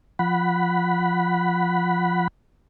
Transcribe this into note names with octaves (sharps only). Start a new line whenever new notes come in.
F3 F#5 B5